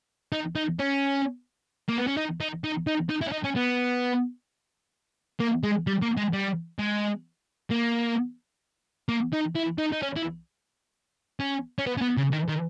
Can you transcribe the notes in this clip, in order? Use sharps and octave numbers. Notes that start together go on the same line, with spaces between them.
D#4
D#4
C#4
A#3
B3
C#4
D#4
D#4
D#4
D#4
D#4
E4
C#4
D#4
C#4
B3
A#3
G#3
G3
A#3
G#3
G3
G#3
A#3
A#3
D#4
E4
D#4
D#4
C#4
E4
C#4
C#4
B3
C#4
B3
C#3
D#3
D#3